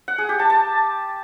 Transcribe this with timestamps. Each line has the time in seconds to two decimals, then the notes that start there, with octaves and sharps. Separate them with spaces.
0.08 F#5
0.18 G#4
0.29 G4
0.39 A5
0.50 A5